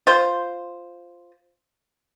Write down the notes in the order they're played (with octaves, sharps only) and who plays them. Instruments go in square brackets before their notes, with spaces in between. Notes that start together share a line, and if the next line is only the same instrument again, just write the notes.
[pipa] F4 C5